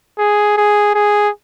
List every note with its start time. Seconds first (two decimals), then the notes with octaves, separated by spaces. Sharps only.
0.18 G#4
0.57 G#4
0.94 G#4